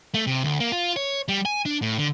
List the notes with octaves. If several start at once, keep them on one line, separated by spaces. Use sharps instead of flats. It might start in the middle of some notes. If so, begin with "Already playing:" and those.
A3
C3
D2
A#3
F4
C#5
G3
G#5
D4
A2
D3